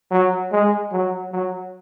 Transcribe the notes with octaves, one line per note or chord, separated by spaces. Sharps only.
F#3
G#3
F#3
F#3